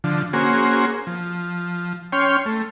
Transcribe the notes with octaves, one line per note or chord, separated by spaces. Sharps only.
D3 F3
A#3 C#4 F#4 G#4 C5
F3
C#4 C#5 G5 C6 F6
A3